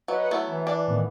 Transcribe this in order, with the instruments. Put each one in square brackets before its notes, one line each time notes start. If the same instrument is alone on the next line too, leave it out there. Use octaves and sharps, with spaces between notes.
[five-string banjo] F#3 [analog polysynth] B4 D#5 F#5
[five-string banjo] F#3 A3 B3 [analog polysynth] E4
[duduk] E3
[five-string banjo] D4 D5
[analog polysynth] A2 D#3 B3